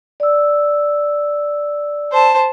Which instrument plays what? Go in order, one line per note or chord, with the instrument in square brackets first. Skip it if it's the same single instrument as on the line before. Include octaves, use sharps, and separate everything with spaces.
[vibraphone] D5 E6
[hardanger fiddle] C5 A5